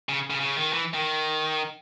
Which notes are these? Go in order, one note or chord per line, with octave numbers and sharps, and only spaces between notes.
C#3
C#3
C#3
D#3
E3
D#3